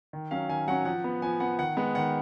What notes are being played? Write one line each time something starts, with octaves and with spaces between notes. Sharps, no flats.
D#3
F#3 C#4 F5
D#3 G#5
F#3 C#4 F#5
F3 F#5
B3
F3 G#5
B3 F#5
D#3 F#5
G#3 B3 F#5
D#3 F#5